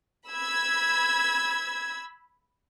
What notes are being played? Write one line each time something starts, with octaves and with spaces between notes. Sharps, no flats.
B5 E6 G#6